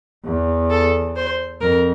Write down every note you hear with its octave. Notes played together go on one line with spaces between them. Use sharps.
E2
A4
C5
F2 A#4